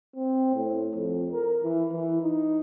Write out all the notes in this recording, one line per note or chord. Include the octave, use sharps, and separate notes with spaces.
C4
A2
F2
A#4
E3
E3
D#4